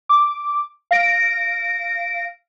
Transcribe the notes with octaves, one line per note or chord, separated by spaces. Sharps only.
D6
F5 A#6 D7